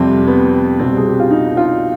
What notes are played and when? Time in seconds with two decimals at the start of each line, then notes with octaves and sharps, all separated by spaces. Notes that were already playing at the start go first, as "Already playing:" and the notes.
Already playing: F2 C3 G3 C4
0.27 B3
0.80 C2 B2 G3 C4
0.97 G#4
1.08 G4
1.20 F4
1.31 D#4
1.57 F4